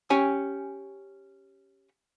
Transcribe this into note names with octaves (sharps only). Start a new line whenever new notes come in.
C#4 G4 C#5 G#5